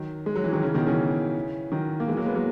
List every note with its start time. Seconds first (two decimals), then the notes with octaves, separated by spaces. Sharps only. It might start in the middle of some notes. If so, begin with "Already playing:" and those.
Already playing: D#3 F#3
0.26 G#3
0.35 F#3
0.44 E3
0.53 D#3 F#3
0.63 C#3 E3
0.74 B2 D#3
0.87 C#3 E3
1.72 D#3 F#3
2.00 A#3
2.08 E3 G#3
2.17 F#3 A#3
2.26 G#3 B3
2.35 F#3 A#3